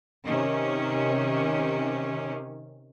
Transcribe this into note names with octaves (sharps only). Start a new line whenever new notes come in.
C3 D#3 C#4